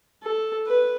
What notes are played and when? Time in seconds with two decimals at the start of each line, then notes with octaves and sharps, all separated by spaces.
0.23 A4
0.67 B4